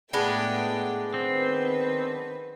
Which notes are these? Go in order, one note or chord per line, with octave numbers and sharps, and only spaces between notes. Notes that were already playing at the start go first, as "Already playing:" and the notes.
A2 G#3 A3 B3 D4 G5
D#3 C4 B4